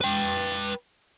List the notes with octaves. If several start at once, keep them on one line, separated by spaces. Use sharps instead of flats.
B4 G5